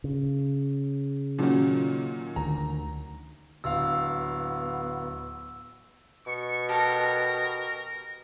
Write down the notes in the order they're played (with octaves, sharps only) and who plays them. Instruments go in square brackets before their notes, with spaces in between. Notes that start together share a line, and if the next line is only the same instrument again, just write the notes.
[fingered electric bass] C#3
[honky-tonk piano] A#2 D#3 [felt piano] F#3 C#4
[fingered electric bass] D2 D#3 [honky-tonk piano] A#5
[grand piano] D1 F5 [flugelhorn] B3 [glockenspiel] E6
[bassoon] B2 [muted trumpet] C#6
[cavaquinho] G4 A4 [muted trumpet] A#4